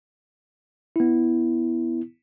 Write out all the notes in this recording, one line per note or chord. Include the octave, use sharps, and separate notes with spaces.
B3 E4